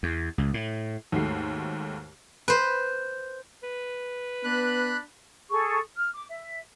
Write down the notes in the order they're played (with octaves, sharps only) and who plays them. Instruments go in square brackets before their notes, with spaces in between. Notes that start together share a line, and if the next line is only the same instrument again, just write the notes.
[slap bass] E2
C#2
A2
[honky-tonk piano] D#2 G#2 A3 F#4 C7
[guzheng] B4 C5
[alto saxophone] B4
[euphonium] B3 [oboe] D4 [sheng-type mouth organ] B5 F#6
[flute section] G#4 A4 C#6
F6
D6
E5